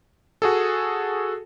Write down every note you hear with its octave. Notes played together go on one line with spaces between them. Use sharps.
F#4 G#4 A4